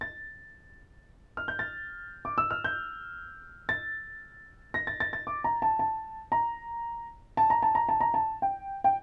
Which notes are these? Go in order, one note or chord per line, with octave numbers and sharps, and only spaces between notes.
A6
F6
G6
A6
D6
E6
F6
G6
A6
A#6
A6
A6
A6
D6
A#5
A5
A5
A#5
A5
A#5
A5
A#5
A5
A#5
A5
G5
G5